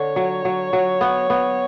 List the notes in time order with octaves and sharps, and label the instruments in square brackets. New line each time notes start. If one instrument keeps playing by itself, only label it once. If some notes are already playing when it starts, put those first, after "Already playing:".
Already playing: [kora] D3 [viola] C#5
[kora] F#3
F#3
F#3
B3
B3